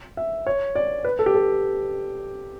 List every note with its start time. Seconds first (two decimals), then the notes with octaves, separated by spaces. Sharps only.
0.17 E5
0.47 C#5
0.75 D5
1.05 B4
1.19 A4
1.26 G4
1.35 A4